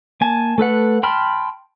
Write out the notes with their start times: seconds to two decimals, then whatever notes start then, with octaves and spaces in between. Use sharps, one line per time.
0.21 A#3 G#5 A5
0.58 A3 A4 B4 F#5
1.03 G5 A5 B5 C6 F6